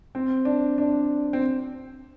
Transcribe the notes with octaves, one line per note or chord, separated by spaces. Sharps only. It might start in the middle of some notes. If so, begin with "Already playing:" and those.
C4
D4
D4
C4